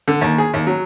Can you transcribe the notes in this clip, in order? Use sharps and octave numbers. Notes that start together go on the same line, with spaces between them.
D3
D#2
G#4
D#2
F#3